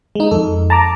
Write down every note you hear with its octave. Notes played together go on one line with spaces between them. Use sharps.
G#3 D#4
F2 A4
A5 A#5 D6